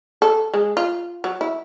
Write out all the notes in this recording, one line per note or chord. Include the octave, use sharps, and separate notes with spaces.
A4
G#3
F4
F#3
E4